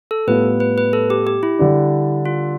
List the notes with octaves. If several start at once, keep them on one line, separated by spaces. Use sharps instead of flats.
A4
A2 G3 B3 F4 B4
B4
B4
A4
G4
G4
E4
D3 G3 D4
F4